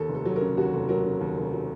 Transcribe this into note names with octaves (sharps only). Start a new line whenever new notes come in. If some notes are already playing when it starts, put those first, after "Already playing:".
Already playing: D#2 A4
F1
A4
F#3
C#3 A#4
D#2 F#4
F1
F#3 A#4
C#3
D#2
F1
F#3